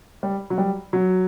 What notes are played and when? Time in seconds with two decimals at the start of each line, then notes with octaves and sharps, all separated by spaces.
0.23 G3
0.50 F#3
0.58 G3
0.93 F#3